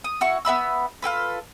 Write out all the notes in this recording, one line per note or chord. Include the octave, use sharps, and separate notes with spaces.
D#6
E4 F#4 C#6
B3 E5 B5 E6
F4 G4 A4 B4